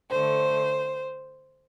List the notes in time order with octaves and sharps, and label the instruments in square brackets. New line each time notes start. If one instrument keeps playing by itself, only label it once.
[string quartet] D3 A3 C5